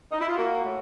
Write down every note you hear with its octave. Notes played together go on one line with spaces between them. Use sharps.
D#4
E4
F4
A#3 F#4
A2